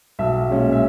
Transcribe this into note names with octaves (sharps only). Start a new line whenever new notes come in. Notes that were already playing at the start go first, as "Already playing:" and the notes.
B1 E5
A#2 G#3 C#4
E5